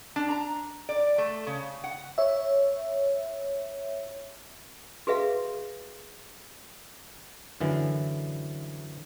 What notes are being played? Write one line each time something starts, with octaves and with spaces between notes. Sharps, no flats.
D4
A#5
D5
A3
C#3
F#5
C#5 E5
F#4 G#4 B4 E5 F5
F#2 D3 E3